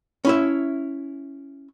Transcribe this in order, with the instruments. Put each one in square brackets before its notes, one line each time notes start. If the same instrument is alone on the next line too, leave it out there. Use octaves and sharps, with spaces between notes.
[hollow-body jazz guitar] C#4 E4 E5